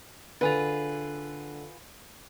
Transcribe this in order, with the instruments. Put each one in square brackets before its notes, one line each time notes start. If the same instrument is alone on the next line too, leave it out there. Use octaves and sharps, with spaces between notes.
[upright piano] D3 [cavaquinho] F4 G#4 B4